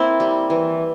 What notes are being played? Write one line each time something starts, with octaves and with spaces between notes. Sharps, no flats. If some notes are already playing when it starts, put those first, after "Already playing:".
Already playing: A#3 C4 E4
G3
E3